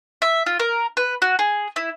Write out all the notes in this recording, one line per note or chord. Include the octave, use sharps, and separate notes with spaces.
E5
F4
A#4
B4
F#4
G#4
E4